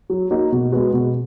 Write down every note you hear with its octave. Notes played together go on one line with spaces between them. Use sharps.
F#3
A#3 D#4 F#4
B2
G#3 B3 F#4
B2